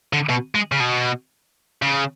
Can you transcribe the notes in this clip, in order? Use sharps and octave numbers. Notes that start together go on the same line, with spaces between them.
D3
B2
G#3
C#3
B2
C#3